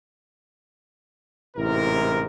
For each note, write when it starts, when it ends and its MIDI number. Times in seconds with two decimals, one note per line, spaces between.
1.57 2.26 33
1.57 2.26 44
1.57 2.26 48
1.57 2.26 64
1.57 2.26 70